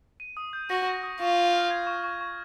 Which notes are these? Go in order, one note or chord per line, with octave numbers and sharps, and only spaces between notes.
D#7
D#6
G6
F#4 A#6
D#7
D#6
F4 C#6
C#6
F6
G#6
C#6
C#6
C#6